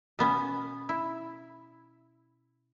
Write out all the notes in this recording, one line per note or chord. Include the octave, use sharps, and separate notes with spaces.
B2 B3 C#4
E4